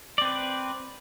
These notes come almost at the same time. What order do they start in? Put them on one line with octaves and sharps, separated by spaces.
D5 C4 B4